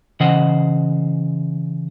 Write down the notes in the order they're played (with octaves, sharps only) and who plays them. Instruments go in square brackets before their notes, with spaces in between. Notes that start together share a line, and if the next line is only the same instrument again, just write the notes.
[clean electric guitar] C#3 E3 C5 D#5 F#5